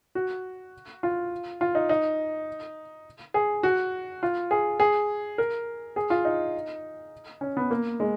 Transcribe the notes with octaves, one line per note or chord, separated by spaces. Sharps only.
F#4
F4
F4
D#4
D#4
G#4
F#4
F4
G#4
G#4
A#4
G#4
F4
D#4
C#4
B3
A#3
G#3